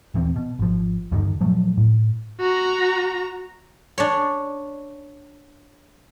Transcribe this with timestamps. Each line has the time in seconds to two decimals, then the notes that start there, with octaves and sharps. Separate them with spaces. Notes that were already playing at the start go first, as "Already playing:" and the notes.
0.14 D#1 E3 B3 C4
0.36 B2
0.59 G#1 F3
1.11 D2 G2 D3 D#3
1.40 A#2 F3 F#3 A3
1.77 A2
2.40 F#4 A#5
3.98 D4 C#5